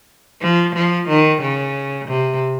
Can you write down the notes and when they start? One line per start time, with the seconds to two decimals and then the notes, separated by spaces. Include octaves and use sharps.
0.42 F3
0.75 F3
1.09 D#3
1.42 C#3
2.08 C3